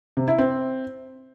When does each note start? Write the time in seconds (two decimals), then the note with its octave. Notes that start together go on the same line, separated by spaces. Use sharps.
0.17 C3
0.28 E4
0.38 C4